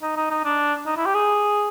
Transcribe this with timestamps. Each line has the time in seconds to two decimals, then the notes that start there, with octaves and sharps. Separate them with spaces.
0.02 D#4
0.17 D#4
0.31 D#4
0.44 D4
0.86 D#4
0.97 E4
1.06 G4
1.15 G#4